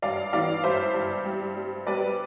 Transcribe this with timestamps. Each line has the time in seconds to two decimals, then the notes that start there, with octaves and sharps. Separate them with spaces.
0.02 G2 D5 F5
0.33 E3 D5 F5
0.63 G2 C5 E5
0.94 G2
1.25 G3
1.56 G3
1.87 G3 B4 D5